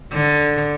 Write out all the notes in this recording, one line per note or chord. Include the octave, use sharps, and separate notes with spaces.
D3